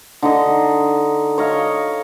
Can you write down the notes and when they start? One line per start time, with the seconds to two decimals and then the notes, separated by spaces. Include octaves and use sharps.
0.23 D3 D#4 D#5
1.38 C#5 D#5 F5